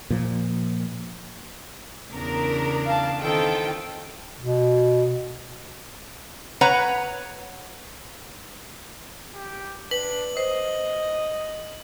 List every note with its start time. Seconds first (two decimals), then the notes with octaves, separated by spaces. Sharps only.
0.10 A#2 F3
2.14 E2 C#3 D4 A#4
2.86 F5 A5
3.21 D#3 E3 C4 F4 A4 G5
4.41 B2
6.61 B4 C#5 F#5 A#5
9.34 G4
9.91 D4 B4 F#7
10.37 C5 D#5